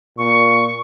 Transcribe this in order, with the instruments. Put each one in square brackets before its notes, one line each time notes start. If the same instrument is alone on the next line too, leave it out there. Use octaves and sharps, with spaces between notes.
[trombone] A#2 [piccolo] C#6